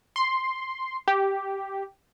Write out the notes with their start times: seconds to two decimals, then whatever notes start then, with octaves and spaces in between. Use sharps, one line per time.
0.16 C6
1.08 G4